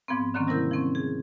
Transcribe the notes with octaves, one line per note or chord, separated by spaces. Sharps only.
G#2 F3 B3 C4
D3 D#3 F#3 A#3 C4 C#4
C3 G3 E4 A#4 G6
F3 C4 C#4
G#4